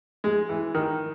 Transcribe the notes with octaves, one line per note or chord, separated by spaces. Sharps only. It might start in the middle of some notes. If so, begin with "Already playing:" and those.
G#3
E3
D#3